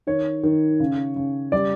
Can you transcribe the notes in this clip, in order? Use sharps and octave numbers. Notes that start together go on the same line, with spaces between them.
D#3 C#5
D#3
C#3
C#3
G3 D5